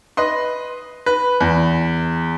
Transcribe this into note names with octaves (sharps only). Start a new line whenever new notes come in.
B4 D#5 C6
B4
E2